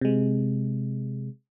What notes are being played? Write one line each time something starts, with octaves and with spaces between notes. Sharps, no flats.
C3 G#3